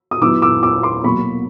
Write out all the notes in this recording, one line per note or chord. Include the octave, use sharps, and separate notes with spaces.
D#6
F#3 B3 E4 D6 E6
D6 E6
D6 E6
C6 D6
B2 F#3 A#3 B5 C#6